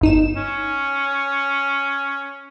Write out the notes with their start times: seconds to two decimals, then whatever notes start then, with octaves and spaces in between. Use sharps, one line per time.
0.01 G1 D#4 E7
0.35 C#4